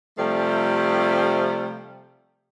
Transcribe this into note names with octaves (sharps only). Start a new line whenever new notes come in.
C3 F3 G3 A3